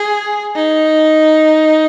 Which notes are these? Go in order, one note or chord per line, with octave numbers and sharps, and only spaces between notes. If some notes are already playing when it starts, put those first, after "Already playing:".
Already playing: G#4
D#4